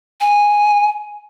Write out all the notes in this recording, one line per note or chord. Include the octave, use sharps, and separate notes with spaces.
G#5